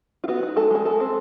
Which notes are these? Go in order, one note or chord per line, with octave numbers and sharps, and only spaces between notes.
F4
B3 F#4
D#4
G#3 A4
G#3 G#4
G#3 A4
C4